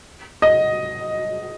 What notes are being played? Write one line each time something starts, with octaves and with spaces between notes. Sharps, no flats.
D#5